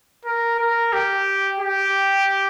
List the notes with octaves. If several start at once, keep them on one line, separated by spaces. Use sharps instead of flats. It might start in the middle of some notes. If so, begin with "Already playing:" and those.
A#4
A#4
G4
G4